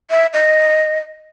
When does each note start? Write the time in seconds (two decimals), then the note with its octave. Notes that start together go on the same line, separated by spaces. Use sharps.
0.10 E5
0.33 D#5